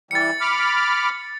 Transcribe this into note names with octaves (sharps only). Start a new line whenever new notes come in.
E3 G3 A6 C#7
B5 D6 F6